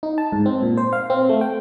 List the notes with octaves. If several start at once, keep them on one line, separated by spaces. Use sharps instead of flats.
D#4
A5
G#2
C4
A#2
C5
F5
C4
A3
G5